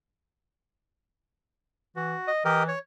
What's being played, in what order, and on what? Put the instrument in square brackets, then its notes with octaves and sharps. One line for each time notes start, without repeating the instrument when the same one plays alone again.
[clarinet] E3 [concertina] F#4
[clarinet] D#5
[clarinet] E3 [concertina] G4 A#4 D#5
[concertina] C#5